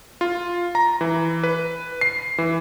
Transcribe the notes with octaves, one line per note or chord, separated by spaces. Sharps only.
F4
A#5
E3
B4
C7
E3